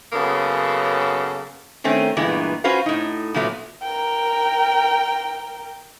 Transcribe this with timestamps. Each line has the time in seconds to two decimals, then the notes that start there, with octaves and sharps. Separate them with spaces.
0.12 F#2 C#3 A#3 B3 A4
1.84 D#3 A3 C4 C#4
2.17 G2 A#2 E3 G#3 B3
2.64 C#4 F4 F#4 B4 C5 F5
2.86 A2 D#4
3.34 A#2 F3 F#3 A3 B3
3.82 A#4 G5